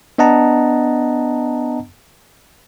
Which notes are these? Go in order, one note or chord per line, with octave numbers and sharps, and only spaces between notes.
B3 D4 D#5 F#5 A5 A#5